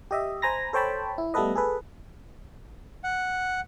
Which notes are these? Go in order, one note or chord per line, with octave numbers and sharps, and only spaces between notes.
G4 D#5 E5
C5 G#5 A#5 B5 A#6
A4 C5 C#5 G5 A5 B5
E4
G3 A3 B3 A4 B4 D#5
G#4 A4 B4
F#5